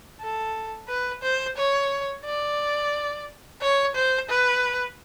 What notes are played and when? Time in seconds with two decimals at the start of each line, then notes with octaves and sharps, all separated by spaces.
0.21 A4
0.88 B4
1.23 C5
1.57 C#5
2.25 D5
3.61 C#5
3.95 C5
4.30 B4